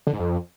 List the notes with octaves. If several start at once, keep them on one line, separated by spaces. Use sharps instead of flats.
D3
G#2
F2